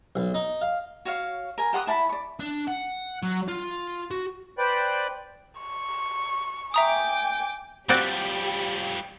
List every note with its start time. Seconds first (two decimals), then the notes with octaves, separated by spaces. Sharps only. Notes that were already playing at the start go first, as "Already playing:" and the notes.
0.15 B1
0.34 D#4
0.62 F5
1.05 F#4 C#5 F5
1.58 A#4 G#5
1.73 G4 F#5 C6 D#6
1.87 E4 A5 B5
2.09 D5 C#6
2.40 D4
2.68 F#5
3.23 F#3
3.48 F4
4.11 F#4
4.58 B4 C5 D5 G5 B5
5.60 C#6
6.74 E5 G5 G#5 A#5 D6 D#6
7.89 F3 G3 C4 F#4 G4 D5